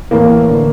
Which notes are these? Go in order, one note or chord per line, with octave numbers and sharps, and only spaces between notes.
A2 E3 A#3
D3